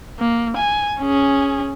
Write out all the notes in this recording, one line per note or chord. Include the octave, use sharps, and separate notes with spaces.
A#3
G#5
C#4 G#4